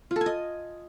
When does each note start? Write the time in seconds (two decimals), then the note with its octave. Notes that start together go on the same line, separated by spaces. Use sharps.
0.11 F4
0.16 A4
0.21 G#5
0.26 D#5